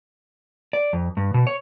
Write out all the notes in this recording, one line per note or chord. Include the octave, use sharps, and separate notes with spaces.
D5
F2
G2
B2
C#5